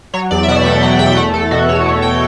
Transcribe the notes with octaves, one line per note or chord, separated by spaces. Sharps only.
F#3 C#5
E2 D5
E5
B2 F#5
A3 G5
F#3 F#5
E2 G5
A3 F#5
E2 A4
B2 F#4
E2 C#5
A3
G5